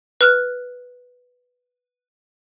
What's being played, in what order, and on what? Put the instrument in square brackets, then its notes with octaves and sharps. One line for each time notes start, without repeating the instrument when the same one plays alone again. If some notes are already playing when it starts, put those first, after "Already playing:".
[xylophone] B4 F6 F#6